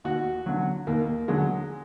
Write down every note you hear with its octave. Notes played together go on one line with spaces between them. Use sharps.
D#2 F#4
D3 F#3
D#2 A#3
D3 F#3 G#3